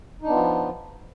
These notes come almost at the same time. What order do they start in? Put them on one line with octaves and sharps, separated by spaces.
D#4 D4 B3 F4 F3